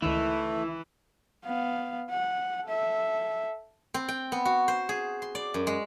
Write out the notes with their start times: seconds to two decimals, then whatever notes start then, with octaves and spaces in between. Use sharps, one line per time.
0.02 C#2 D#3 E3 A3 E4
1.45 B3 F5
2.10 F#5
2.66 A4 E5
3.94 C4
4.09 G5
4.32 B3
4.45 F#4
4.68 C5
4.89 G#4
5.22 C6
5.35 D5
5.54 F#2
5.67 G#3